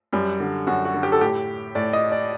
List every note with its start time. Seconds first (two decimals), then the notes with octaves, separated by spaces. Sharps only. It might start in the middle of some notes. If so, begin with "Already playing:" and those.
0.13 F#2 G3
0.40 D3
0.67 F#2 F#4
0.85 F#4
0.94 D3
1.03 G4
1.12 A4
1.21 A2 G4
1.75 A2 D5
1.93 D#5
2.12 D5